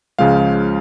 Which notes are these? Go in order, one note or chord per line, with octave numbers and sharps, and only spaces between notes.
C#2 C#3 F3 G#3 F5